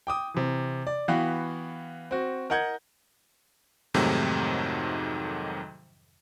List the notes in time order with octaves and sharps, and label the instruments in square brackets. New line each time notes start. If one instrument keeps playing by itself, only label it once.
[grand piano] G5 D6 D#6
C3 E3
D5
E3 B3 F#4 F5 G5
C4 F#4
A#4 D#5 F#5 G6 G#6
[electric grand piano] F2 G#2 C3 D#3 F#3 A3